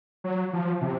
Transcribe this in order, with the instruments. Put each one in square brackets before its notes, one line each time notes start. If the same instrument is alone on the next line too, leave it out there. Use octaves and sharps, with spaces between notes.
[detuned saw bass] F#3
F3
C3